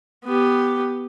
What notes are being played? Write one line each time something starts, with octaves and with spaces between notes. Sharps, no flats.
B3 G4